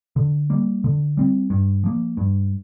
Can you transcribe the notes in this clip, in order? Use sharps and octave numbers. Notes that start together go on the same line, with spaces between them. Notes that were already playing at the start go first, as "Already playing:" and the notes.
D3
G3 A#3
D3
G3 C4
G2
F3 A#3
G2